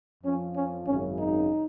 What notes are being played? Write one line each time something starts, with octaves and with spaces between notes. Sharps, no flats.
F2 F3 C#4
C#4
G#1 F#2 C#3 C#4
D#4